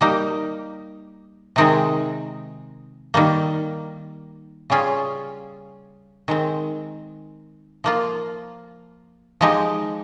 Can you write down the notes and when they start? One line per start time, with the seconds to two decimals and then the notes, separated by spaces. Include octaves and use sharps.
0.01 G3 A#3 D#4 G4
1.56 C3 D#3 G#3 C4 D#4
3.14 D#3 G3 A#3
4.70 C#3 G3 C#4 F4 G#4
6.28 D#3 G#3 C4
7.84 F3 A#3 F4
9.41 F3 G#3 D#4 G4